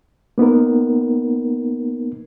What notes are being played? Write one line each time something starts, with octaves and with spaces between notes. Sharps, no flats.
A#3 B3 D#4 A#4